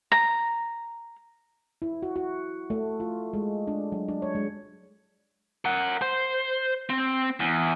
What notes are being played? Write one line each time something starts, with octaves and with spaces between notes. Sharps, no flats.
A#5
E4
F#4
F#4
A3
F4
G#3
D4
F#3
D4
C#5
G#3
A#4 F#5
C5
C4
E2